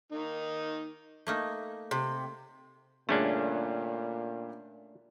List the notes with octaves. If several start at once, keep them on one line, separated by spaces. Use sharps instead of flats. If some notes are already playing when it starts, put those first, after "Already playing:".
D#3 A#3 D#4
A3 A#3 D#4
C3
G2 A#2 D3 A3 C#4 D4 G#4